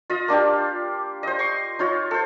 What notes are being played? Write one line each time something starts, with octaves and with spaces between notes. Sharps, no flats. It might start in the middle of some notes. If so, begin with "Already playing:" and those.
F4 D#5
A#3 D4 F4 G4
C5 D#5
C6 C#6
D#4 F4 C#5
A4 C5